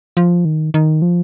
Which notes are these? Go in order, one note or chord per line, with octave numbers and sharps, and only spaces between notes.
F3
D#3
D#3
F3